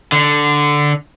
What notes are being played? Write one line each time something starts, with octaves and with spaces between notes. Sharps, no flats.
D3